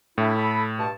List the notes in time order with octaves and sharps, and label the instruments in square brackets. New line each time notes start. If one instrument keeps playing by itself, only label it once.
[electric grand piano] A2 [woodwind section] A3 D4 E4
[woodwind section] A4 B5
G2 B2 A5